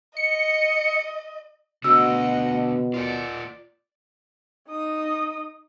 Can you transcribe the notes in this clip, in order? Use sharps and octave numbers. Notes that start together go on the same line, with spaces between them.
D#5 C#7
B2 D3 F#4 D#5 F#5 E6
F4 A#4 D5 F#5
D#4 D#6